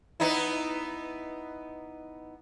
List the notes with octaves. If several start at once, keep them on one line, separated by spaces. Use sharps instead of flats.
B3 D#4 E4